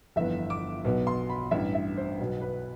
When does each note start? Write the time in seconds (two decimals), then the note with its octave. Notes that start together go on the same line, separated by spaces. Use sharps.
0.16 G1 F2 E3 B3 E5
0.50 D6
0.84 B1 B2 B3
1.07 C6
1.30 B5
1.51 A1 G2 E3 E5
1.75 E5
1.97 C5
2.19 B1 B2 B3
2.41 B4